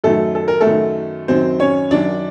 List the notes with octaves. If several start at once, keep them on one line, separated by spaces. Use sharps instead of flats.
F#2 D#3 F#3 A3 A4
A4
A#4
A3 A4
F#2 D#3 F#3
F#2 D#3 F#3 C4 C5
C#4 C#5
F#2 D#3 F#3 D4 D5